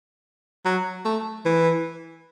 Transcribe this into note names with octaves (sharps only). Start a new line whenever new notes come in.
F#3
A3
E3